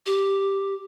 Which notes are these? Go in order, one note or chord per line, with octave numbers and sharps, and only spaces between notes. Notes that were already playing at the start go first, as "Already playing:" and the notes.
G4